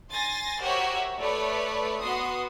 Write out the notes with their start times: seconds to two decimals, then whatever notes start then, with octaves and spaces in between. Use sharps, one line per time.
0.11 G#5 C6 A6 A#6
0.61 F#4 G4 A#4 C5 C#5 E5
1.19 A3 B4 C#5 D5
2.00 B3 F#4 C6 D#6